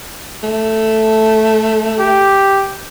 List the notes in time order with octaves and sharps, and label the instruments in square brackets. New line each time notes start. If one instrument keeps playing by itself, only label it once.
[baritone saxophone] A3
[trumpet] G4